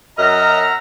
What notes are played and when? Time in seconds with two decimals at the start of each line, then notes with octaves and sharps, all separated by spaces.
0.18 F#2 D#5 E5 F#5 A#5 F6